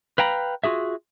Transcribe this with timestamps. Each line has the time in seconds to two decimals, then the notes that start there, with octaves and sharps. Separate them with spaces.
0.18 B4 F5 G5 A#5 B5
0.64 F4 F#4 G#4 E5